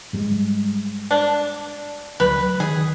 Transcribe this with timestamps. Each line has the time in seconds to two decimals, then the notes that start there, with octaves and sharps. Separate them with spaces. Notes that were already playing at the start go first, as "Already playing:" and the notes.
0.13 G#2 G3 G#3
1.11 D4
2.20 D2 F#3 B4
2.60 D#3 G#4